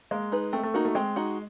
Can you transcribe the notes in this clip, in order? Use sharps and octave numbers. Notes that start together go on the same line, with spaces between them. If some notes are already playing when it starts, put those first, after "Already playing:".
G#3 A#3
D#4 G#4 B4
A3 C4
A3
A#3 D#4 F#4
A3
G#3 C4
D#4 F#4